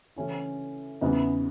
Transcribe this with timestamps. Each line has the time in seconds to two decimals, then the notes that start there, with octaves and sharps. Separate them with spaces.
0.16 C#3 E3 A3 C#4 E4
1.01 E2 C#3 E3 B3 D#4